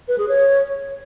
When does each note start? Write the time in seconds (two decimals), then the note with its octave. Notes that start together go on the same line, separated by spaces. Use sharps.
0.08 B4
0.18 G#4
0.28 C#5